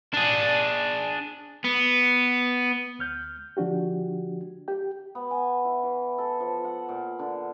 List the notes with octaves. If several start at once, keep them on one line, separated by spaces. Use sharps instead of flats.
D4 G#4
B3
D2 F6 G6
D3 F3 D4 F#4 G4
G4 G5
B3
G#5
E4
E3
A4
F3
F#5
A#2
D3